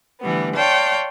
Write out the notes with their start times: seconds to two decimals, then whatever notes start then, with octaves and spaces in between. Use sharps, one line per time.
0.21 D3 E3 G3 A3 B3
0.56 C#5 D5 F5 G5 A5 C6